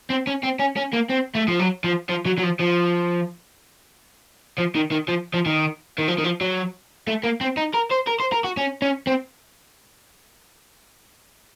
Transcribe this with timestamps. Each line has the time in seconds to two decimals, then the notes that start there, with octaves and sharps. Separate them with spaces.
0.10 C4
0.27 C#4
0.43 C4
0.59 C#4
0.76 C#4
0.93 A#3
1.09 C4
1.35 A3
1.48 F3
1.60 F#3
1.84 F3
2.09 F3
2.25 F#3
2.38 F#3
2.43 F3
2.59 F3
4.58 F3
4.75 D#3
4.91 D#3
5.08 F3
5.34 F3
5.46 D#3
5.98 D#3
6.08 F3
6.19 D#3
6.24 F3
6.41 F#3
7.08 A3
7.24 A#3
7.41 C4
7.57 D#4
7.74 A#4
7.91 C5
8.07 A#4
8.20 C5
8.32 A#4
8.44 F#4
8.57 C#4
8.82 C#4
9.07 C4